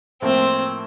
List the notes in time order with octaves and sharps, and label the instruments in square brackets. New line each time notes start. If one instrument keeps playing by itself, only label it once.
[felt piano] A2 F3 A#3 [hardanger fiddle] C4